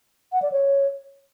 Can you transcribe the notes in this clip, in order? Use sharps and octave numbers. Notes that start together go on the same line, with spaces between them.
F#5
D5
C#5